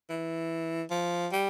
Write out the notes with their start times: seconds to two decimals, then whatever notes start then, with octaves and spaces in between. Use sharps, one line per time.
0.09 E3
0.91 F3
1.32 G3